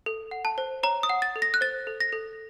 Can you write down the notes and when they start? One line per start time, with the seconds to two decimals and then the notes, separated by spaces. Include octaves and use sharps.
0.06 A4
0.31 F#5
0.45 A5
0.58 C5
0.83 C#5 A#5
1.03 D#6
1.09 F#5
1.22 A6
1.36 A4
1.42 A#6
1.54 F#6
1.61 C5 A6
1.87 A4
2.00 A#6
2.12 A4